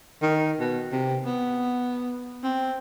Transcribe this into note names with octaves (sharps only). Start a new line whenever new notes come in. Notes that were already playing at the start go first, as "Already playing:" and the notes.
D#3
B2
C3
B3
C4